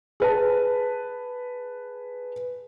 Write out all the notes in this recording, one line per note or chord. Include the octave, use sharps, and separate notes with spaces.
G#4 B4 A5